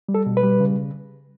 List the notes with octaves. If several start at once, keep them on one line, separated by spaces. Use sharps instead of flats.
G3
A4
B2
B4
G3
C#3